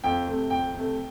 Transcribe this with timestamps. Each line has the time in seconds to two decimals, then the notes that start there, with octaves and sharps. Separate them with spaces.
0.04 F2 G5
0.27 C3 A3
0.50 F2 G5
0.74 C3 A3